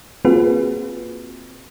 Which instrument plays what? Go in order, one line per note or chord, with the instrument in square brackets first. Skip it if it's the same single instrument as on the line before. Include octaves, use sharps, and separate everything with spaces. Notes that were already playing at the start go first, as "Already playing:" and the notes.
[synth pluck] A#3 C4 F4 F#4 G#4 B4